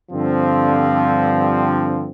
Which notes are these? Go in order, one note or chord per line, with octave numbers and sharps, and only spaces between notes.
G2 D3 F3 C4